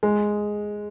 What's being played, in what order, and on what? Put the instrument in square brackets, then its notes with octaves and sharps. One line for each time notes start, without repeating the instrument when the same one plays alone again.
[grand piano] G#3